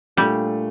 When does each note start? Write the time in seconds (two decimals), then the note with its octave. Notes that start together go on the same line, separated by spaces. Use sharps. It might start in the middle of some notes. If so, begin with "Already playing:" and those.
0.17 A#2 G3 A3 D4